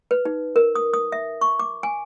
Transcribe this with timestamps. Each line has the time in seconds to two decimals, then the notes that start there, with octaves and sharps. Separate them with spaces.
0.11 B4
0.25 D#4
0.56 A#4
0.75 D#6
0.93 D#6
1.12 E5
1.41 C#6
1.59 D6
1.83 G#5